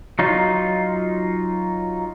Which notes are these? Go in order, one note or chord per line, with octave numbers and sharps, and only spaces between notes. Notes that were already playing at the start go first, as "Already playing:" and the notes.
F#3 D#4 F4